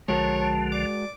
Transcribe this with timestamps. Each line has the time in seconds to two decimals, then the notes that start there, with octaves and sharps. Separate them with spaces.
0.08 B1 D3 F3 G#3 F#4 A#4 C#5 A5
0.39 A5
0.72 D5 D6